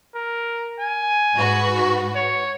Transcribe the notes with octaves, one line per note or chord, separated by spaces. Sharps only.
A#4
G#5
G#2 F#4 B4
C#5